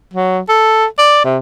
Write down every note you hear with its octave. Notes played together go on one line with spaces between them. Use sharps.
F#3
A4
D5
C3